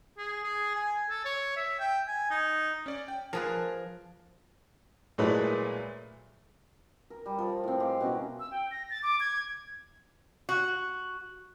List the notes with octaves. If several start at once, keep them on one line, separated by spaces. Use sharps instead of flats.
G#4
G#4
G#5
A4
C#5
E5
G5
G#5
D#4
C#4 D5
G5
F3 G#4 A#4 B4 A5
A#2 F#3 G#3 A3 E4 B4
A#4
G3
F3
A2 C4
G#3 G4 F5 C6
B2 C#4 E4 A#4
E6
G5
A#6
A6
D6
G#6
F#4